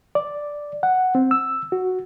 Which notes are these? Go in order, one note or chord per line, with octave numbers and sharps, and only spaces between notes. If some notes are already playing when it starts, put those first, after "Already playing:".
D5
F#5
C4
E6
F#4